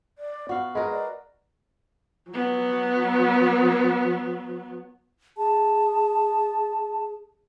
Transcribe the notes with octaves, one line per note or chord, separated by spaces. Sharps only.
D5
B3 F#4 F5
G#3 A#4 B4
D5
F#3 B3
G#4 A5